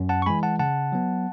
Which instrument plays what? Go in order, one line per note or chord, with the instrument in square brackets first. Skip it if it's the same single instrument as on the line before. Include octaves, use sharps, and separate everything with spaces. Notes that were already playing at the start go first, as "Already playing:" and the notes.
Already playing: [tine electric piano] F#2
F#5 A5
C#6
E3 G#3 G#5 B5
F#5 A5
C#3 F#5 A5
F#3 B3